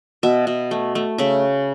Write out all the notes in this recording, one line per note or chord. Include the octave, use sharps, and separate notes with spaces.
B2 E5
B2
A3
A3
C#3 E5